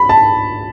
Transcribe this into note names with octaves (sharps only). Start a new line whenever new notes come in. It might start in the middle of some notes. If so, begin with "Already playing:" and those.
Already playing: B5
A5